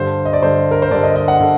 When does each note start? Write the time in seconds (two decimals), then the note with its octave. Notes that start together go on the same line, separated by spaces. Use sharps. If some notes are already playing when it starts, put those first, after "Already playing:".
Already playing: G2 D3 C5
0.25 D#5
0.33 D5
0.42 G2 D3 C5
0.71 A#4
0.82 C5
0.91 G2 D3 D5
1.03 D#5
1.16 D#5
1.28 F#5
1.40 D3